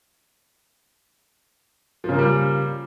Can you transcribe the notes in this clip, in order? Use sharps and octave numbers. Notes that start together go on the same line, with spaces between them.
C#3 F3 G3 A#3